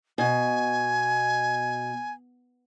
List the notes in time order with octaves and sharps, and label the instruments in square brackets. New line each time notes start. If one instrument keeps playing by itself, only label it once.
[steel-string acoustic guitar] B2 [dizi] G#5